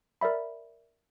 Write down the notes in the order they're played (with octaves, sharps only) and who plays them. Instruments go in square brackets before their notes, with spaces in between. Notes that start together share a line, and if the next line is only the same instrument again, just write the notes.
[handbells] A#4 D5 E5 B5